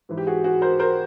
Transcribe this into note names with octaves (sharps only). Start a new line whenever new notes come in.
G#2 E3
G4
F#4 G#4
F#4 G#4
A#4 C5
A#4 C5